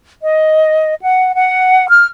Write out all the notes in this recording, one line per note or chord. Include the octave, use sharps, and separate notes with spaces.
D#5
F#5
F#5
F6